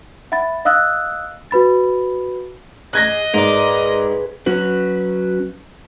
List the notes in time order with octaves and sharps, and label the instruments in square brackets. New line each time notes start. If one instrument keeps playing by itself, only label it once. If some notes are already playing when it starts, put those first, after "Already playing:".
[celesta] E5 F#5 B5 A6
D#5 F5 D#6 E6 F#6 A6
F#4 B4 B5 A6
[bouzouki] G#4 [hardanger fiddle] D#5 [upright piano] F#6 G#6 A#6
[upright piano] G#2 [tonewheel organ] G#4 B4 [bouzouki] A#4 D5
[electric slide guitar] F#3 C#4 F#4 B4